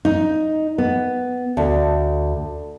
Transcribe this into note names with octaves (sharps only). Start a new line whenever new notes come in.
D#4
B3
D2